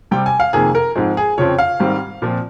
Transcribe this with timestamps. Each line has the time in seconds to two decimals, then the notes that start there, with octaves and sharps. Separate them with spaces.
0.11 C3 G3 C4 G5
0.26 G#5
0.40 F5
0.53 F2 C3 D#3 A#3 G#4
0.75 A#4
0.96 G#2 F3 G#3 C4
1.17 G#4
1.38 F2 C#3 F3 C4 C#5
1.59 F5
1.80 G#2 D#3 G3 C4
2.22 A#2 F3 C4